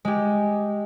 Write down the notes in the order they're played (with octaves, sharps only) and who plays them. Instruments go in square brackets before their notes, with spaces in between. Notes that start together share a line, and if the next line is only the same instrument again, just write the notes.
[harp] G#3 G4